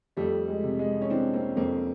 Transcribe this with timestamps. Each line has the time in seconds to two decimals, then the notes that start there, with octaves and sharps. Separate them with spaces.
0.17 F2 G3 A3
0.48 G#3
0.63 C3
0.79 G#3
1.02 C#4
1.10 E3 C4 D4
1.33 A#3 C4
1.57 F2 A#3 C4